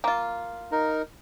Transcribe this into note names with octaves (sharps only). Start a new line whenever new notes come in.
A#3 F4
D#4 A#4